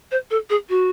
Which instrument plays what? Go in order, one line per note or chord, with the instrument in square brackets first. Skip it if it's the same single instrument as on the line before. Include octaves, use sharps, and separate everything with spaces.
[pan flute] C5
A4
G#4
F#4